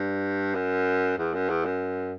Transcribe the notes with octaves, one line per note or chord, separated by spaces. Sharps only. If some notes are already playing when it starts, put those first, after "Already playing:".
Already playing: G2
F#2
E2
F#2
E2
F#2